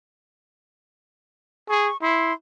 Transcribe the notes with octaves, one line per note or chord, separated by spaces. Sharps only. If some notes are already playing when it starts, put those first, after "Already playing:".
G#4 C#6
E4 C6